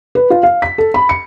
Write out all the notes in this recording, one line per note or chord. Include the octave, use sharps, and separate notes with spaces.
B4
F4
F5
B6
A4
B5
C#7